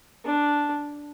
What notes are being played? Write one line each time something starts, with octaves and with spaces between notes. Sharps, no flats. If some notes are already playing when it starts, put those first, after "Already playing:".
D4